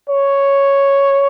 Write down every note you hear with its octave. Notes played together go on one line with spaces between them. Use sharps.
C#5